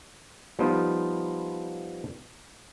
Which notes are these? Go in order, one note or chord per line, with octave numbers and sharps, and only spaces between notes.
F3 G3 B3 D#4 F4